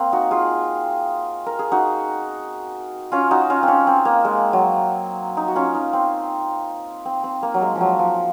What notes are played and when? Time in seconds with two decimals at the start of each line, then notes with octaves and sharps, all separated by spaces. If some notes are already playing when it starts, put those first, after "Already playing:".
Already playing: A#3 C4
0.12 D#4 F#4
0.31 F4 G#4
1.46 A#4
1.59 G#4
1.72 D#4 F#4
3.12 C#4 F4
3.31 D#4 F#4
3.50 C#4 F4
3.63 C4 C#4
3.87 C4
4.05 A#3
4.25 G#3
4.53 F#3
5.37 D#4
5.48 F#4
5.56 C#4 F4
5.75 D#4
5.93 C4
7.05 C4
7.24 C4
7.43 A#3
7.54 F#3
7.62 G#3
7.75 F3
7.81 F#3
7.99 F3